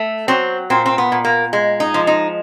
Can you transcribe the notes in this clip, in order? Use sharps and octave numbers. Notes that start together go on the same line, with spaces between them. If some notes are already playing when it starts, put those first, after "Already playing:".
Already playing: A3
F#3 C4
A#2 C4
C4
B3
A#2
A#3
G#3
D#4
F3
D#4